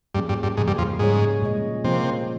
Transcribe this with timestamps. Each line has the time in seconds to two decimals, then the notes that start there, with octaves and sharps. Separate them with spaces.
0.14 G2 F3 A#3 C#4 G#4
0.29 G2
0.43 G2
0.57 G#2 C#3 F3 A#3
0.67 G2
0.78 F2
0.99 G#2 G3 C#4 G#4 C#5
1.42 A#2 G#3 C#4 G#4 D#5
1.84 C3 F3 A#3 F4